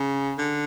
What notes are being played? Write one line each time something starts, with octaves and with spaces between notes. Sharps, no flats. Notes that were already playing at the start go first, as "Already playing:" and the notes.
Already playing: C#3
D3